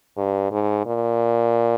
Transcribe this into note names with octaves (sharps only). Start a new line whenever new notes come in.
G2
G#2
A#2